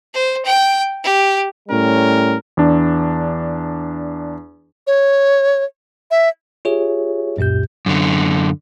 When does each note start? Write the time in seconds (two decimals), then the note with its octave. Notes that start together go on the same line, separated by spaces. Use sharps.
0.14 C5
0.45 G5
1.04 G4
1.69 A2 G3 C#4 A#4
2.57 E2 D4
4.87 C#5
6.11 E5
6.65 F4 G4 G#4 C#5 E5
7.37 C#2 F#2 A#2 G4 G6
7.86 F#2 D3